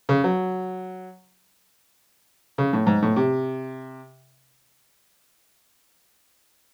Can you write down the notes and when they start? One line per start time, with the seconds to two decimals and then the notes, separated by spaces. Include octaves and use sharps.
0.09 C#3
0.24 F#3
2.58 C#3
2.73 A2
2.87 G#2
3.02 A2
3.16 C3